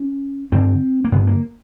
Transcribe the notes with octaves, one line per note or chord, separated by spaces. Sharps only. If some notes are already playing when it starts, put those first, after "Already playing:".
Already playing: C#4
G2 D3 C4
A#3
G2 D3 B3
A#3